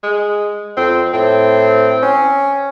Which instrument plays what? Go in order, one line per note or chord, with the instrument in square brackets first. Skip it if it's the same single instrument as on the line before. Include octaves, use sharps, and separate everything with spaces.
[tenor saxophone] G#3
[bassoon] F2 [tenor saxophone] C4
[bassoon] A2 [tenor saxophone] C4
[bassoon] C#4